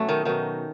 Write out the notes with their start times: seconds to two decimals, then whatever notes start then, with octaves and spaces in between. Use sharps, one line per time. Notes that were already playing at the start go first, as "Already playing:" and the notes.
Already playing: B2 F#3 A3 C#4
0.09 D#3 D#4
0.25 B2 D#3 F#3 D#4